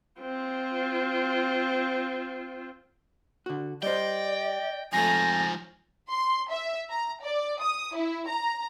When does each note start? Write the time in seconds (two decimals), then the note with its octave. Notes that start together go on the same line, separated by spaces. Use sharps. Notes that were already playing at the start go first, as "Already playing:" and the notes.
0.20 C4 F4
3.46 D3 F#4
3.83 G3 C5 D5 D#5 G5
4.93 F2 G#2 F3 A3 G#5 A#6
6.10 C6
6.50 E5
6.89 A#5
7.22 D5
7.60 D#6
7.95 E4
8.28 A#5